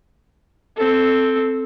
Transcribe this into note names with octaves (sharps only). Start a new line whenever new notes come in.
C4 A4